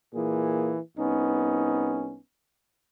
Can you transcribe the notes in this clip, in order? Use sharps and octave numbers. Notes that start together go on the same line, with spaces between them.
A#2 E3 A#3 G#4
C2 B3 C#4 D#4